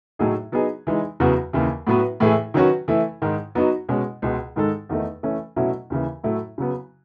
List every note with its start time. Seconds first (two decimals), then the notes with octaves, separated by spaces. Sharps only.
0.19 A2 F#3 A3 D#4 G#4
0.52 F#3 B3 D#4 G#4
0.87 E3 G#3 D#4
1.20 E2 C#3 F#3 B3 F#4
1.53 D#2 C#3 E3
1.87 A2 F#3 B3 F#4 B4
2.20 A2 E3 A3 E4 G#4
2.54 D#3 F#3 C#4 F#4 B4
2.88 E3 A3 E4
3.22 G#2 D#3 G#3
3.55 F#3 B3 D#4 F#4
3.89 B2 G#3 C#4
4.22 C#2 B2 G#3
4.56 G#2 D#3 G#3 D#4 A4
4.89 E2 D#3 A3 D#4
5.23 E3 A3 C#4
5.56 B2 F#3 A3 C#4 E4
5.90 D#2 C#3 E3
6.24 A2 F#3 A3 E4
6.58 C#3 F#3 B3